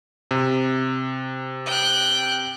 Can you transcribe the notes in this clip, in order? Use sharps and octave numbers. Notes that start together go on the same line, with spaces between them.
C3
G5 F#6